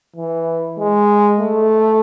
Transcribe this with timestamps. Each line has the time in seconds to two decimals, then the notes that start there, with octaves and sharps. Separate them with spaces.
0.16 E3
0.78 G#3
1.39 A3